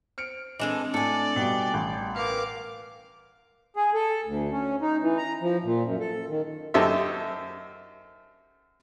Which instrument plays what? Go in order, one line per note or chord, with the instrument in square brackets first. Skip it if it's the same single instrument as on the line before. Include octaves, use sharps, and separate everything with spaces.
[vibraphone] C5 [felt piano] F6 C#7 D7
[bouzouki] E3 G#3 A4 [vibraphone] C4 D4 [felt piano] D#5
[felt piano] A2 [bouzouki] A4 G#5 [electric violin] D5
[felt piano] G2 B2 [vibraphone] G3 G5
[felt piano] A1
[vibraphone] A#4 B4 [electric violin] F5 D6
[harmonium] G#4
A4
D2
C#4
D#4
E3
A#5
F3
A#2
F#2
A4
D#3
[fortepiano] F#2 D#4 G4 A4 C5 E5